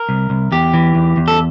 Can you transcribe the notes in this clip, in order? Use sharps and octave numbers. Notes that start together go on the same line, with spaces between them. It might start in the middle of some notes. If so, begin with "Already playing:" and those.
Already playing: A#4
C2
C2
E2 G4
E3
E2
E2
A4